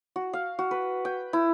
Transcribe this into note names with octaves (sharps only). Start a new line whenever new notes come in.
F#4
F5
F#4
B4
G5
E4